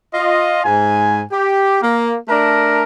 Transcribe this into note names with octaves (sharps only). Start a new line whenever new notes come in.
F4 D#5
G#2 G#5
G4
A#3
A3 D4 A#4